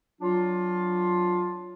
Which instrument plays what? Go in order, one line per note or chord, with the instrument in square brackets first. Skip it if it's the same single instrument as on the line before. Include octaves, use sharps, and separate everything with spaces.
[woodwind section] F#3 D4 F4